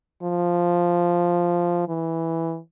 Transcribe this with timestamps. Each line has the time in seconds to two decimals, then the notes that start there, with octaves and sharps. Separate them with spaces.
0.23 F3
1.89 E3